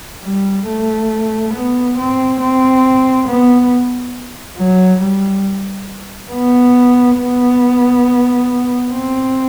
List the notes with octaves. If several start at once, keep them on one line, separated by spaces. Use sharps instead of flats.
G3
A3
B3
C4
C4
B3
F#3
G3
B3
B3
C4